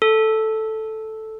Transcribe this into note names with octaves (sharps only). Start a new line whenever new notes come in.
A4